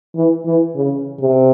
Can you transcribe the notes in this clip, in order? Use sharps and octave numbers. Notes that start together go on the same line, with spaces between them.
E3
E3
C#3
C3